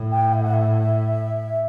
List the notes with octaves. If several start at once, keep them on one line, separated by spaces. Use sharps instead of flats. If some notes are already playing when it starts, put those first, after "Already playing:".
Already playing: A2
G5
E5
F#5
E5